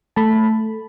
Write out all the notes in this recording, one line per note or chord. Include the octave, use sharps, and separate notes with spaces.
A3 A5 B5